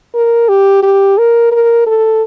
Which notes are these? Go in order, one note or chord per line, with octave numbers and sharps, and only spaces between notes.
A#4
G4
G4
A#4
A#4
A4